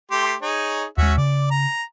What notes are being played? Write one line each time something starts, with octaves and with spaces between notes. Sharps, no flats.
A3 G4 C6
D#4 G#4 C#5
D#2 G#3 C#4 F#4 E5
C#3 D5
A#5